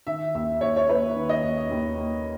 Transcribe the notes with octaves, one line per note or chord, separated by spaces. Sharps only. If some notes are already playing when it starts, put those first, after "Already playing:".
D#3 E5
D#2 E5
D#2 C#5
C#5
A#3 B4
D#3
D#5
D#2
D#2
A#3